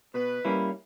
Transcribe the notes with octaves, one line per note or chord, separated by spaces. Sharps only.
B2 B4
G3 A#3 C#4 E4